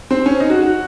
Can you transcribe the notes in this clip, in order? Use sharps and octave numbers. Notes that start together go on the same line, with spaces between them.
C4
C#4
D#4
F#4
F#4